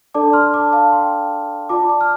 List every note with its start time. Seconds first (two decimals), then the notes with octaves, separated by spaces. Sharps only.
0.14 D4 A4 D5 A5 D6
0.33 C6 F6
0.54 A5 D6
0.73 F5 A5
0.92 G5 C6
1.69 F4 D5 A5 D6
1.89 A5 D6
2.01 F6